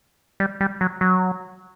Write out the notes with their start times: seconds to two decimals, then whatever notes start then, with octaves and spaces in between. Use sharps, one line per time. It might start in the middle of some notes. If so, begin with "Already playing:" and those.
0.40 G3
0.61 G3
0.81 F#3
1.01 F#3